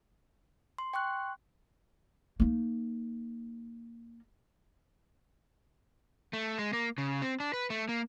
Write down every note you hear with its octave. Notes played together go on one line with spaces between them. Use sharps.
C6
G5 C6 C#6 F#6
A#3 D#4
A3
G#3
A#3
C#3
C4
D4
B4
A3
A#3